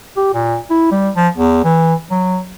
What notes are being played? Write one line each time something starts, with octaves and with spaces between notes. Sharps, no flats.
G4
A#2
E4
G3
F3
E2
E3
F#3